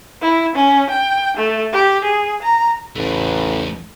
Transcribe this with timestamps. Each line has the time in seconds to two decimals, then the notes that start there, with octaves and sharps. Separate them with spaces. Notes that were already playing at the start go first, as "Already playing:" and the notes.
0.22 E4
0.55 C#4
0.89 G5
1.37 A3
1.73 G4
2.04 G#4
2.42 A#5
2.96 A1 E2 A3